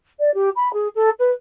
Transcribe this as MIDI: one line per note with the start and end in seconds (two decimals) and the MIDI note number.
0.19 0.33 74
0.34 0.50 67
0.56 0.72 83
0.74 0.88 68
0.95 1.10 69
1.20 1.31 71